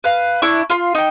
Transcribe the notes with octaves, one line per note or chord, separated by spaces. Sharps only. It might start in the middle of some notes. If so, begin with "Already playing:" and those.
B4 F5
D4 E4 C#6 F#6
F4 C6
D#4 G5